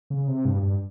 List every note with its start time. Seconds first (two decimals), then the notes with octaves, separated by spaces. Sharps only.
0.10 C#3
0.28 C3
0.45 G2
0.63 G2